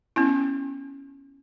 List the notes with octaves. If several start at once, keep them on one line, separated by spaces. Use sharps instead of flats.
B3 C#4 E4